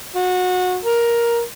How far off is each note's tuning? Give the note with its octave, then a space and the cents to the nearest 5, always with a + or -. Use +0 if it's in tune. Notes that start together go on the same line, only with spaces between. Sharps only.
F#4 -25
A#4 +10